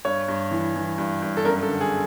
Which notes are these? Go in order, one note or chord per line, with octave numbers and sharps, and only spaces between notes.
G2 C#5
G2
E3
E3
G2
G2
A4
F#2 A#4
A4
D3
G#4